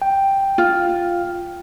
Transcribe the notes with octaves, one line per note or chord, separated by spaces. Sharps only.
G5
F4